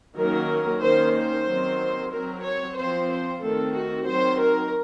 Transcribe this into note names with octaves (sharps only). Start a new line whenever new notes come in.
D#3 F#3 A#3 C#4 A#4
D#3 A#3 C#4 C5
C5
D#3 F#3 C4
F#3 C4 A#4
C#5
F3 C4 C5
C5
D#3 A3 C4 A4
F#4
D#3 F#3 C4 C5
A#4